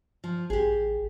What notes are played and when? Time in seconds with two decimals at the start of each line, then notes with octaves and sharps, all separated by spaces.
0.24 F3
0.50 A1 G4 G#4